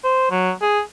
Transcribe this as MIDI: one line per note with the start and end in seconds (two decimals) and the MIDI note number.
0.04 0.31 72
0.31 0.52 54
0.62 0.81 68